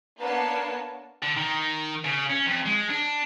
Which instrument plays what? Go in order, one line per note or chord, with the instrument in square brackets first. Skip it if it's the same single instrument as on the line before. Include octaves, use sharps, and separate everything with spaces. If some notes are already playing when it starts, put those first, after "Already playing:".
[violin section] A#3 B3 D4 C#5 A5
[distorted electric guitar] D3
D#3
C#3
C#4
F2
G#3
D4